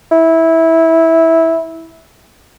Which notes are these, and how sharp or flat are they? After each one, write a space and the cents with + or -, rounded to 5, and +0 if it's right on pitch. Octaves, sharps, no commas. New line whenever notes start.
E4 -15